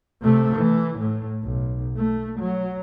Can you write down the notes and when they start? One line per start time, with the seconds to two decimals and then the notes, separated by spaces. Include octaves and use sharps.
0.22 C3 A3
0.56 E3
0.99 A2
1.43 B1
1.97 A3
2.39 F#3